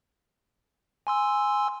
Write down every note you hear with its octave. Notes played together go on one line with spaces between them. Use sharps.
G#5 C6 E6